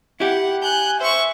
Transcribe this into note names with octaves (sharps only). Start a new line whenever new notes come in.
E4 G4 F#5
G#5 F#6 G6
C5 E5 C#6